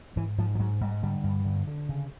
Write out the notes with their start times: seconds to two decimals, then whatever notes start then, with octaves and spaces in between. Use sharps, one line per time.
0.16 G#2 E3
0.38 G#2 F3
0.55 F3
0.59 G#2 F#3
0.81 G#2 G3
1.03 D3 G3
1.24 G2
1.45 D3
1.67 D3
1.89 C#3